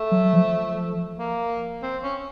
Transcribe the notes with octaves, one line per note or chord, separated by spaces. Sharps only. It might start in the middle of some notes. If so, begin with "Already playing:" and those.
Already playing: A3
F#3
F3
A#3
C4
C#4